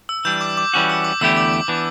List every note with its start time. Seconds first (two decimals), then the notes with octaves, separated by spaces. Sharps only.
0.09 E6
0.25 E3 G3 D4 G6
0.41 D6
0.57 D6
0.74 E3 G3 C#4 F#4
0.90 E6
1.05 D6
1.21 E2 D3 A3 E4 G4 E6
1.37 D6
1.53 D6
1.68 E3 B3 D4